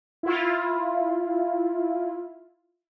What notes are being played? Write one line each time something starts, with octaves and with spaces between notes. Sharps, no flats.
E4 F4